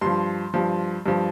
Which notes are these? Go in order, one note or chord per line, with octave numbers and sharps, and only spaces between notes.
G2 F3 C6
G2 F3
G2 F3